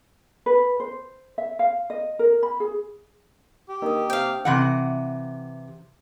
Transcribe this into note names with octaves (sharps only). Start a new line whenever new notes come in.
B4
C5
E5
F5
D#5
A#4
B5
G#4
G4
D#3 A#3 D4 D#6
C3 F5 G5
C3 E3 F#5